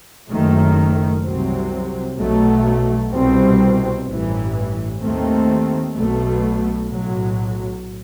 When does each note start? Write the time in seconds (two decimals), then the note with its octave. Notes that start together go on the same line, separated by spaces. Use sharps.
0.29 F#1 F#2 D#3 A3
1.23 C2 C3 F#3 C4
2.17 B1 B2 F#3 A3
3.12 C2 B2 G3 C4
4.06 A1 G2 E3
5.01 D#2 D#3 A3 C4
5.94 B1 B2 A3
6.89 B1 A2 F#3